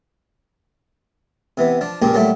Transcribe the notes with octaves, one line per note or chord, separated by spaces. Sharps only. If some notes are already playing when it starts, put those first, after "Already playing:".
C3 E3 B3
F3 D4
C#2 A#2 F3 A#3 G4 G#4
A#2 F#3 G3 A3 E4